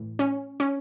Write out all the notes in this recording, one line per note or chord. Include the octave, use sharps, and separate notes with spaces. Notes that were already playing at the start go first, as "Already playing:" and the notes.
Already playing: A2 E3
C#4
C#4